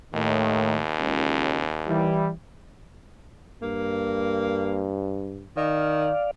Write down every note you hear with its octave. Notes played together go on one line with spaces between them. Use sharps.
D#2 A2 D#3
C#2
E3 G3 E4
G2 A#3
D#3 D5 F5